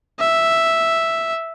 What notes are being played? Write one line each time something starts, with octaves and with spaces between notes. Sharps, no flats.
E5